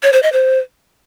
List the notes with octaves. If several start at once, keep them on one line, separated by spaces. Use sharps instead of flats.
C#5
C5
D#5
C5